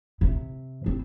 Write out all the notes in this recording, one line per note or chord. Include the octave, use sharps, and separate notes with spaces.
C3
C4